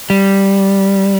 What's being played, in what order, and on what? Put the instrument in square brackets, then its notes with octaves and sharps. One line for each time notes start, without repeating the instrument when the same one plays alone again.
[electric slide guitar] G3